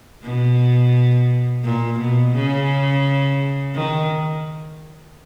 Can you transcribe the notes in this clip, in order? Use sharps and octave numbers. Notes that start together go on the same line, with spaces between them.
B2
A#2
B2
C#3
D#3